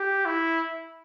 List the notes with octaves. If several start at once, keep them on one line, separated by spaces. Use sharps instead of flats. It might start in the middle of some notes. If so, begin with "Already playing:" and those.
Already playing: G4
E4